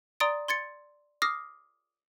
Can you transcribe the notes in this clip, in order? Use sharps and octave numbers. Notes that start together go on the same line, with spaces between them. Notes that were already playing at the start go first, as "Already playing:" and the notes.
D5 A#5 C6 D#6 A6 D7
C6 G#6 A6 C#7
D6 D#6 F6 A#6 C7